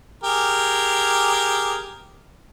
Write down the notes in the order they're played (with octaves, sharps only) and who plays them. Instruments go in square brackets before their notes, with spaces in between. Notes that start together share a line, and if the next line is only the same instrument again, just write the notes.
[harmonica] G4 G#4 A#4